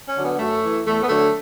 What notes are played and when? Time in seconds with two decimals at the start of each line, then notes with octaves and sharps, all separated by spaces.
0.09 C#4
0.16 D3 F#3
0.24 B3
0.39 F#2 A3
0.63 E3
0.86 E2 A3
1.03 B3
1.09 D3 F#3 A3